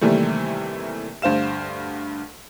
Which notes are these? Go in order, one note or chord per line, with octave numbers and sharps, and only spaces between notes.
D#2 C3 E3 G3 A3
D2 G2 C5 F5 E7